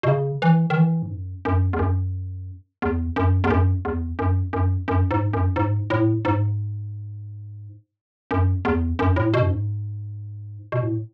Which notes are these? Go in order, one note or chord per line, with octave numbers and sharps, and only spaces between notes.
B2
C#3
E3
D#3
E3
G#2
F#2
F#2
E2
F#2
E2
F#2
E2
F#2
E2
F#2
F#2
F#2
G#2
F#2
G#2
A2
G#2
F#2
E2
F#2
A2
B2
F#2
G#2
B2
A2